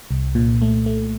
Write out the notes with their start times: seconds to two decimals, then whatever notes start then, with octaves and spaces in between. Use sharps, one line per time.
0.11 C2
0.35 A#2
0.62 A3
0.86 A3